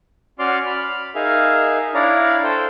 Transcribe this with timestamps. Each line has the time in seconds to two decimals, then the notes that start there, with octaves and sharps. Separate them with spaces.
0.39 C#4 F#4 D5 C6 D6 F6
0.66 B5 F6
1.15 D#4 G#4 A#4 E5 F5
1.94 D4 E4 C#5 D5 F5 A#5
2.44 A4 C5 G5